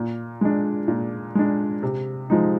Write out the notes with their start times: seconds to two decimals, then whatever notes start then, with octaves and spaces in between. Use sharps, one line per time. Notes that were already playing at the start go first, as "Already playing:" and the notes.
Already playing: A#2
0.41 G#3 D4
0.88 A#2
1.35 G#3 D4
1.83 C3
2.30 F3 G#3 D#4